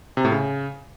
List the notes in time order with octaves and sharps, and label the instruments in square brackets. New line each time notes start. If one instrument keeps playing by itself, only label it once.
[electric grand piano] C3
A2
C#3